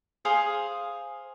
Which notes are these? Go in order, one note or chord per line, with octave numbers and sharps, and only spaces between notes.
G#4 C5 F5 D#6